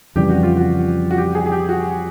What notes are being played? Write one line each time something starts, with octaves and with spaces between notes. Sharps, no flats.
F2 C#3 E3 G3 G4
F#4
F4
F#4
F#4
G4
G#4
G#4
G4
F#4